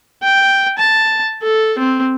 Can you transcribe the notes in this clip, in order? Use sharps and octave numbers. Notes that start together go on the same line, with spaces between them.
G5
A5
A4
C4